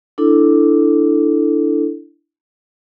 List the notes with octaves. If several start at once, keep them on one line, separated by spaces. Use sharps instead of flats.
D4 E4 A4